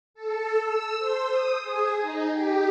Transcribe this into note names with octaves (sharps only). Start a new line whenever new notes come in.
A4
E6
C5
D#6
G#4
D#4
G4